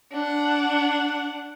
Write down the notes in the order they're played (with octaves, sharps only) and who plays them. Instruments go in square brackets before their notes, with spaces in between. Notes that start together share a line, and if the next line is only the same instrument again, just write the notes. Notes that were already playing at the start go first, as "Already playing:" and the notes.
[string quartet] D4 F#5